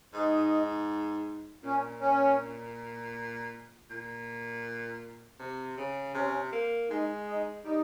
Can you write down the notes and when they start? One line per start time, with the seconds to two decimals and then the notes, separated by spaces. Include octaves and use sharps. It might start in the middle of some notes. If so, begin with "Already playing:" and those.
0.14 G#2 D#4
1.63 A#2 C#4
2.01 C#4
3.90 A#2
5.39 C3
5.77 C#3
6.14 C3 C#4
6.52 A#3
6.90 G#3 D#4
7.27 D#4
7.64 G3 D#4